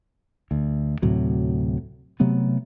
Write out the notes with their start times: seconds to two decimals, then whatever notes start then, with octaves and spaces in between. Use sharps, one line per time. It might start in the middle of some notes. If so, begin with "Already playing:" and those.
0.51 D2
1.02 D2 A2 C3 F#3
2.20 C3 F#3 A3 B3